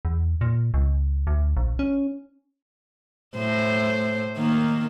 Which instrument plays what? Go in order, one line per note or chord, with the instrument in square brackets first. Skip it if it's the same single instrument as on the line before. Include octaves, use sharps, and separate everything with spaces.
[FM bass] E2
A#2
C#2
D2
A#1
C#4
[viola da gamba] A2 C5
D#3 A#3